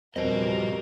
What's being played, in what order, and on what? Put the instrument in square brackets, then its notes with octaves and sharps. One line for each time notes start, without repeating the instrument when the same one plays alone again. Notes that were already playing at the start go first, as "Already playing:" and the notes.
[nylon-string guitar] E2 C4 [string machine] G2 F3 G3 [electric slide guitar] F#4 D#5 [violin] A#4